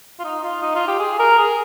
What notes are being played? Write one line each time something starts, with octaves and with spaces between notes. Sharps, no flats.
F4
D#4
F4
D#4
F4
G4
G#4
A#4
G#4